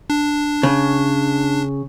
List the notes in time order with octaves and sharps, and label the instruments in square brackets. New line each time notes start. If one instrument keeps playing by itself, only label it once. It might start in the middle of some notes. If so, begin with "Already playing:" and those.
[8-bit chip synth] D4
[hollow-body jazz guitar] C#3